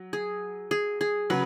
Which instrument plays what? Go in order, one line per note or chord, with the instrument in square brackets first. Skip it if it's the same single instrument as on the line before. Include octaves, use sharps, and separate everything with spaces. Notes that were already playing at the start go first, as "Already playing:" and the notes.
Already playing: [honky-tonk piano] F#3
[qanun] G#4
G#4
G#4
[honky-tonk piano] C#3 F#3 [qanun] B4